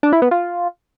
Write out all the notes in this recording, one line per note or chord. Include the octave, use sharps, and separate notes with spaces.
D4
E4
B3
F4